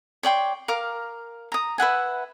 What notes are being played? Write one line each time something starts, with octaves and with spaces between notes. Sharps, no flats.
C#5 D5 G5 C6
A#4 F5 D6
A#5 D#6
B4 E5 F#5 G#5